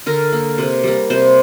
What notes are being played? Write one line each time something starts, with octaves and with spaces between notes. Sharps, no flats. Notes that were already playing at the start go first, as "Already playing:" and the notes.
D3 A#4
A#3
C3
G3 A#3
C3 C5